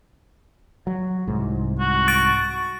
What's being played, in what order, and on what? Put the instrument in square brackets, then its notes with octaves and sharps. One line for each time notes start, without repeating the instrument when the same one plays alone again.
[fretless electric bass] F#3
C2 G#2
[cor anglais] F#4
[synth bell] C#6 A6 D7